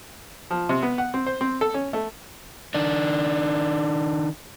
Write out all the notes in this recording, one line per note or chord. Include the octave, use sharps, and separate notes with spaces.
F3
C3
B3
F#5
C4
C5
C4
A4
C#4
A3
D#3 D4